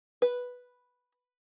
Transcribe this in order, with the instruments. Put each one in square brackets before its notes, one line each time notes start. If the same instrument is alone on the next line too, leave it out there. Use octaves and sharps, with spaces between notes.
[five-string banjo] B4